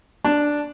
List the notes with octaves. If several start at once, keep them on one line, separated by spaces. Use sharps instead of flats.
D4